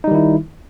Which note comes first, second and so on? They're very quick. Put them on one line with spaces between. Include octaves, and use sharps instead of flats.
D#4 G3 D#3 E4